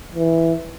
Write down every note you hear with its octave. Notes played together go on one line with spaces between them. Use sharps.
E3